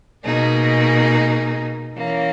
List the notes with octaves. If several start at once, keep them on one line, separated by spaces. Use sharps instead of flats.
B2 A#3 D#4 G#4
E3 A#3 C#4